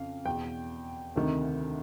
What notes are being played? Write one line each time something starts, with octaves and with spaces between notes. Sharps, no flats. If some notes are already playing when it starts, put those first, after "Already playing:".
Already playing: F2 C#3 F5
E2 B2 G5
D2 C3 D#3